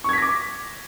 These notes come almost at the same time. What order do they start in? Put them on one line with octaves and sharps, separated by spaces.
C#6 G#6 B6 A#6 D6